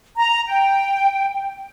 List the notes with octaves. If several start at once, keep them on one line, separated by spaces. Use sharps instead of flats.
A#5
G5